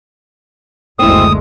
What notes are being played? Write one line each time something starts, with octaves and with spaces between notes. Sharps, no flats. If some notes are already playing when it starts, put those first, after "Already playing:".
F#1 D2 G#3 C4 E4 D#6